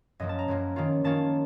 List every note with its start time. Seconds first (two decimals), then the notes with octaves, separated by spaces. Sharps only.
0.19 F#2 F3 A#3 D#5
0.29 A5
0.39 A#5
0.48 F#2 F3 A#3
0.76 D#3 A#3 C#4 F4
1.04 D#3 A#3 C#4 F4 A5